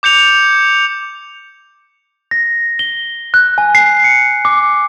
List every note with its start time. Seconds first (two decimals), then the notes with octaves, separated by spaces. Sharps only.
0.03 D6 G6 C#7 F7
2.31 A#6
2.79 G7
3.34 F#6
3.58 G#5
3.75 C7
4.04 C#7
4.45 D6